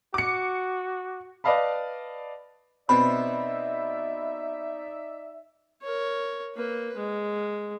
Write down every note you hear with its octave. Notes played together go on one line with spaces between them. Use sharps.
F#4 D6 C#7
B4 D5 D#5 F5 A5 B5
B2 B3 C4 D#4 D5 E5 B5
A#4 C#5
A#3 B4
G#3